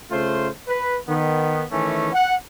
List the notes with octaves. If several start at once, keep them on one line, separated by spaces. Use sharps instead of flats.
C#3 A3 F4 C5
B4
D#3 B3
D#3 E3 A3 C#4
F#5